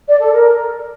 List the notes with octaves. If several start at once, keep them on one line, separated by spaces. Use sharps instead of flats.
D5
A4
A#4